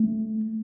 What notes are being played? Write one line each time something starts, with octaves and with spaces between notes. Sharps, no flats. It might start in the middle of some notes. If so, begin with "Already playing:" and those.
Already playing: A3